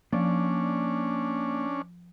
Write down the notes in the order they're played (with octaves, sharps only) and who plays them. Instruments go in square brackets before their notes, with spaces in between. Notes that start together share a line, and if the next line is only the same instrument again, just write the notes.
[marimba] F3 [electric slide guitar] A#3 D5 [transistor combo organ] C#4 D4